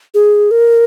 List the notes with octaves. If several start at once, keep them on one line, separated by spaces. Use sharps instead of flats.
G#4
A#4